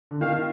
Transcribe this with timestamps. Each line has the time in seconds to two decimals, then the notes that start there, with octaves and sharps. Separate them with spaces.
0.11 D3
0.21 D#3 F5